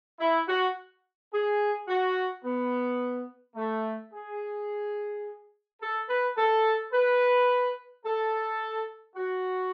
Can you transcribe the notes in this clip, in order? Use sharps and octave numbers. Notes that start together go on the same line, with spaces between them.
E4
F#4
G#4
F#4
B3
A3
G#4
A4
B4
A4
B4
A4
F#4